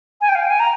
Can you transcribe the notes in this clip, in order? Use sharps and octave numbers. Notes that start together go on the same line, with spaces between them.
G#5
G5
F5
G5
G#5
A#5